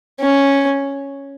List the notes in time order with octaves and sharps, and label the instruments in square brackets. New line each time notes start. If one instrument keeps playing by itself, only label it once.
[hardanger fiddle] C#4